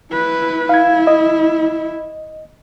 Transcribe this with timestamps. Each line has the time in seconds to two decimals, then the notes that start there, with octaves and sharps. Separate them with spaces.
0.11 E4 B4
0.69 E4 F5 G#6
1.07 D#5